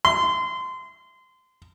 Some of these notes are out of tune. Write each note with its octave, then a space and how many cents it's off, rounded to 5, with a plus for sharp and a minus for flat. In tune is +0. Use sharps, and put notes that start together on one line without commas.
C6 -25